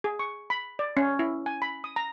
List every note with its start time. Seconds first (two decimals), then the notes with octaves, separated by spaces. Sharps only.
0.04 G#4
0.19 C#6
0.50 B5
0.79 D5
0.97 C#4
1.19 E4
1.46 G#5
1.62 B5
1.84 D#6
1.96 A#5